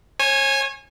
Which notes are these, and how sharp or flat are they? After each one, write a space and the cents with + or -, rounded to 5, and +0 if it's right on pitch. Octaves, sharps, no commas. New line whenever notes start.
C#5 -35 G#5 +0